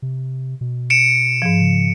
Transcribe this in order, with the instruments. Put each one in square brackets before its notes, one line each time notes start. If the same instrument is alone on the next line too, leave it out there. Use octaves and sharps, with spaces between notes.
[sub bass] C3
B2
[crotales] C#7 D7 E7
[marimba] G#2 F3
[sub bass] C#3